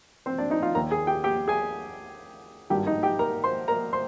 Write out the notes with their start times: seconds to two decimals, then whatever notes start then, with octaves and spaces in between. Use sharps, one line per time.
0.26 C4 C5
0.38 D4 D5
0.50 D#4 D#5
0.63 F4 F5
0.75 D#2 D#3 A#4 A#5
0.91 G#4 G#5
1.07 G4 G5
1.24 G4 G5
1.48 G#4 G#5
2.70 G#1 G2 D#3 G4 G5
2.87 D#4 D#5
3.03 G4 G5
3.19 A#4 A#5
3.44 C5 C6
3.68 A#4 A#5
3.93 C5 C6